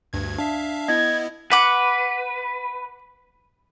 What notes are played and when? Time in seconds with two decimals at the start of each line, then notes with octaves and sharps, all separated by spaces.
0.13 D2 G2 G#6
0.38 D4 E5 F5
0.89 B3 E4 D#5 G#6
1.51 B4 F#5 D6